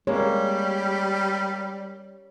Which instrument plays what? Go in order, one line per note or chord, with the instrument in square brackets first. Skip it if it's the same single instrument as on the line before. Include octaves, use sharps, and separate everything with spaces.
[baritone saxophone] G3 [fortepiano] G#3 A#3 [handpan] C#5